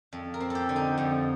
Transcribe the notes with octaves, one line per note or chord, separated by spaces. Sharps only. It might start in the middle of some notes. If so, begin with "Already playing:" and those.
F2
A#4
C4
G4 A4
D3
D#4
F2